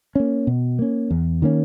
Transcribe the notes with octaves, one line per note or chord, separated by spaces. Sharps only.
A#3 C#4
B2
A#3 C#4
E2
D#3 A#3 C#4